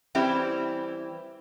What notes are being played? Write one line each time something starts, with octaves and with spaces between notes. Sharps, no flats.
E3 G3 C4 E4 G4